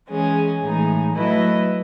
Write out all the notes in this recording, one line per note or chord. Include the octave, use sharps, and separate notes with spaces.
E3 G#3 C#4 G#4
A2 E3 G#3 D#4 G#4
F#3 A3 E4 B4 D#5